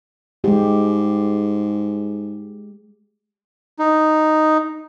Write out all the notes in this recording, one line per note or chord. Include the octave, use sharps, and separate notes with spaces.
G#2 G#3 G4
D#4